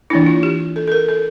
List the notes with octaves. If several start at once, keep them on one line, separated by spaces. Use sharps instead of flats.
E3 A#3 D4 E4
F4
G4
A4
A4
A#4
A4